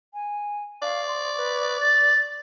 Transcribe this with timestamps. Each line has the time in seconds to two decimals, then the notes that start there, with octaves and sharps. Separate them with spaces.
0.14 G#5
0.82 D5 F5
1.08 C6
1.37 B4
1.81 A6